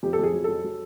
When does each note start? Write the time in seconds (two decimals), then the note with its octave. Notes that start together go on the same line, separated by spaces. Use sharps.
0.03 F2 G4
0.13 A4
0.19 F2 G#4
0.33 F#3
0.44 F#3 A4
0.64 F#3